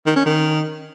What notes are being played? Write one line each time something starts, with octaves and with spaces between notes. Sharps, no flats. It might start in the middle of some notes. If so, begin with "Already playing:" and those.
D#3
C#4
D#3